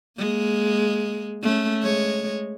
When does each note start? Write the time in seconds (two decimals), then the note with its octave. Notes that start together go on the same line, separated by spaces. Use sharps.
0.18 G#3 A#3
1.42 A3 C#4
1.82 G#3 C#5